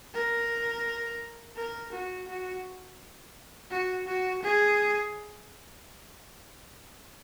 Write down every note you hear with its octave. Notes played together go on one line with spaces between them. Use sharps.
A#4
A#4
F#4
F#4
F#4
F#4
G#4